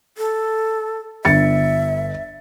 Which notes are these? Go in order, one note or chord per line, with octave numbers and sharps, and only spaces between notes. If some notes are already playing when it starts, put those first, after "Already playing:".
A4
G1 E5 A6 C#7